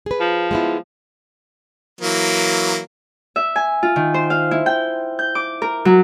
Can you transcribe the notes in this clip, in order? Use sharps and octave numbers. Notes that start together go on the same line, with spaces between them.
G#4 B4
F3
G#3 B3 E4
E3 F#3 A#3
E5
G#5
F4
D#3
C5
F5
E4
G5
G6
D6
A#4
F#3